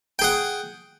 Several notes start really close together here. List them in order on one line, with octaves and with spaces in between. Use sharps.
G5 G#4 F#5